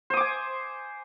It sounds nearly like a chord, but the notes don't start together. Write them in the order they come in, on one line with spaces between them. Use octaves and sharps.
C5 D#6 D6 G#5